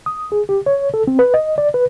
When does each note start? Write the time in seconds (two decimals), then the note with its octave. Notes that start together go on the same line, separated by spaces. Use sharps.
0.06 D#6
0.32 G#4
0.49 G4
0.66 C#5
0.94 A4
1.07 C4
1.19 B4
1.34 D#5
1.58 D5
1.74 B4